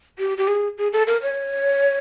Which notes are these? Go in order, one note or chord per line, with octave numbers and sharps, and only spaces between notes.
G4
G4
G#4
G#4
A4
A#4
C#5